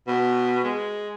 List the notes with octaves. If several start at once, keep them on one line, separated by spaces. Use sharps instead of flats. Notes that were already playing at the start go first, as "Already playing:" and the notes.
B2
G#3